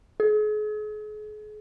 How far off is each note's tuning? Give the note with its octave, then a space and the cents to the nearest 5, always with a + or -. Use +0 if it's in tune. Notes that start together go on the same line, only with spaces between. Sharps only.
G#4 +40